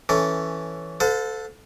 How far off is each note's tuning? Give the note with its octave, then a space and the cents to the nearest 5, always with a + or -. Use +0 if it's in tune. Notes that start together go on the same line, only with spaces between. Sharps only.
E3 +0 C#4 +0 A4 +0
A4 +0 C5 -45 F5 +45